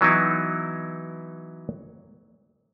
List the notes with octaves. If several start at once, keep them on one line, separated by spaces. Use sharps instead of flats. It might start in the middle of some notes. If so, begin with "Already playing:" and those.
E3 F#3 B3 D#4 E4